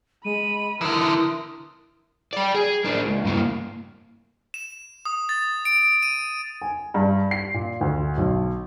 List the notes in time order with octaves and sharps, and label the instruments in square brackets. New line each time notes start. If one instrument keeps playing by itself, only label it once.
[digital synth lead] G#3 [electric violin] B5 [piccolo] D#7
[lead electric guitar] D3 E3 [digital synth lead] E4 [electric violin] A#4 C6 [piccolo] D#6
[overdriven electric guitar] G4 D5
G#4
A#3 D4
C#2
G2 A#3
[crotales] E7
D#6
A6
D7
D#7
[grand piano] G#5
G2
C7
A#2
D2
B1